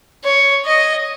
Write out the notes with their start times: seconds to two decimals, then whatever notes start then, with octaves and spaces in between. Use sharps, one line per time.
0.24 C#5
0.65 D#5